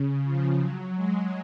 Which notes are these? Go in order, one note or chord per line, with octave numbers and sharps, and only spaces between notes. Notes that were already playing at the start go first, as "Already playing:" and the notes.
Already playing: C#3
F3
F#3
G#3